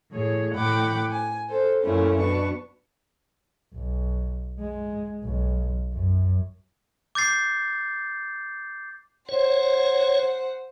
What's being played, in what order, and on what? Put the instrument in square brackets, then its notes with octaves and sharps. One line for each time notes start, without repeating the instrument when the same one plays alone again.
[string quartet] A2 G#4 C#5
A2 F#5 G5 B5 D6
G#5
A4 C5
F#2 A#2 A3 C#4 E4
B2 D4 B4 C#6
[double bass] B1
G#3
B1
F#2
[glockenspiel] D6 G6 A6 C7
[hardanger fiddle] C5 F#5 [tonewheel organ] C#5